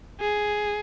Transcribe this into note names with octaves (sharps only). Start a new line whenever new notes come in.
G#4